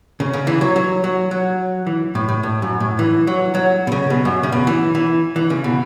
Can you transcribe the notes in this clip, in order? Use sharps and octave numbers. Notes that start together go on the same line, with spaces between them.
C#3
C#3
E3
F#3
F#3
F#3
F#3
E3
A2
A2
A2
F#2
A2
E3
F#3
F#3
B2
C#3
B2
F#2
C#3
B2
E3
E3
E3
C#3
B2